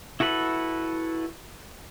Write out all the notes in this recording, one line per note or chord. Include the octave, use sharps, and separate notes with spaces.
E4 F#4 A4 B4 B5